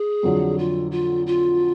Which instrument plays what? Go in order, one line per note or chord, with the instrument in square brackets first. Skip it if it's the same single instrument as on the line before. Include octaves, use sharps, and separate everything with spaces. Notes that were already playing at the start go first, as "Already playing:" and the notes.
Already playing: [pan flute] G#4
[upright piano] F2 D3 F#3
[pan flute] F4
F4
F4